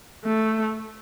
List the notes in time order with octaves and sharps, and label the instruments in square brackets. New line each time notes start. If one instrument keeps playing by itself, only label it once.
[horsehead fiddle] A3